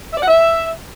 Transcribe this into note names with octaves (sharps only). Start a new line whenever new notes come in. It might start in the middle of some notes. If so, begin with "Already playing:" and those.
E5
D5
F#5
E5